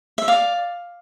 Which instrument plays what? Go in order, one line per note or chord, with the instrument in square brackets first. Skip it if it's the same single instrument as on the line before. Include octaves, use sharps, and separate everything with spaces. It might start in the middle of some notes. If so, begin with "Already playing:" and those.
[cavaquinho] E5
D5 F5